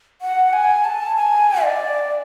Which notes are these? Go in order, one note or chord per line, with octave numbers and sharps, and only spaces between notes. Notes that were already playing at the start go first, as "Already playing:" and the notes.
F#5
G#5
A5
G#5
D5